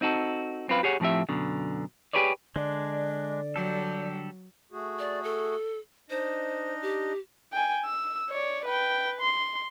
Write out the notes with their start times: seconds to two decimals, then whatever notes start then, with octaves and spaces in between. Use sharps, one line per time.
0.01 C4 D#4 F#4 A4
0.68 F#2 C4 F4 B4 F5
0.83 G4 G#4 C#5 F#5
1.00 A2 F3 C4 G4 E5
1.29 F#2 B2 D3
2.13 G4 G#4 B4 C#5 D5
2.56 D3 G#3 D4 D5
3.56 F#3 G3 G4 A4
4.72 A3 F#4 G#4
4.99 D5
5.23 A4
6.10 D4 D#4 C5 D#5
6.82 G4
7.53 G5 G#5
7.85 E6
8.30 C#5 D5
8.65 B4 G5
9.21 C6